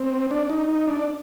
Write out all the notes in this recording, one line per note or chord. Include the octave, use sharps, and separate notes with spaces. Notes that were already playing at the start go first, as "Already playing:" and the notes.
Already playing: C4
D4
D#4
D#4
D4